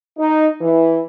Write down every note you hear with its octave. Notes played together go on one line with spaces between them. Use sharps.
D#4
E3